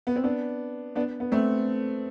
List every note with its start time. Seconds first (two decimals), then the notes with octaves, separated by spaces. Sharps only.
0.07 B3
0.16 C4
0.24 B3 D4
0.96 B3 D4
1.20 B3
1.32 A3 C4